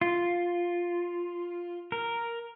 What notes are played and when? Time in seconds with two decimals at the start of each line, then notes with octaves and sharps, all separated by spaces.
0.01 F4
1.92 A#4